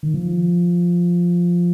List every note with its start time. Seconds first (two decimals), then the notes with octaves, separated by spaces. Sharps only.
0.03 D#3
0.14 F3